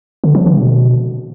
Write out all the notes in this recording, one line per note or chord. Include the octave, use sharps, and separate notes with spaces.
D3
F3
D3
B2